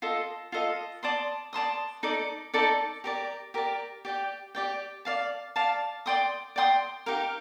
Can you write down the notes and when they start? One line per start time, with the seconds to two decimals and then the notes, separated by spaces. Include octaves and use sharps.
0.02 F4 A4 D#5
0.52 F4 A4 D#5
1.03 D5 A5 C6 D#6
1.53 D5 A5 C6 D#6
2.03 D#4 A4 D5 A5
2.54 D#4 A4 D5 A5
3.04 G4 A#4 D5
3.54 G4 A#4 D5
4.05 G4 D5 G5
4.55 G4 D5 G5
5.05 D5 F5 A5
5.56 D5 F5 A5
6.06 D5 G5 C6 D#6
6.56 D5 G5 C6 D#6
7.06 D#4 G4 A#4 F5